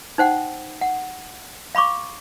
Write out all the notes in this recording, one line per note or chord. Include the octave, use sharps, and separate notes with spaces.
D#4 C5 F#5 G5
F#5
F5 B5 C#6 D6